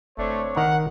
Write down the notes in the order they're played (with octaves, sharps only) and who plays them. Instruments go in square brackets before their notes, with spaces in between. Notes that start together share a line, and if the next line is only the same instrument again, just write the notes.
[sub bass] F#1 [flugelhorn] A3 [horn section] C4 D4 C#5
[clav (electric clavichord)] D#3 A#5 [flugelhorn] F#5